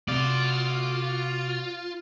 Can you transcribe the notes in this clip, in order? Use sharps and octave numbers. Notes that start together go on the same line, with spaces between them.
C3 F4 F#4 D5